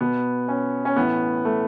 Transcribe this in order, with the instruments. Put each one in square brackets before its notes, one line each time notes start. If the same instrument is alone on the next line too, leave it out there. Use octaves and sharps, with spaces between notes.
[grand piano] B2 B3
C#4
C#4
A2 E3 B3
A3